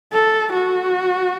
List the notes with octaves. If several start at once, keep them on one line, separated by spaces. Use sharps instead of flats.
A4
F#4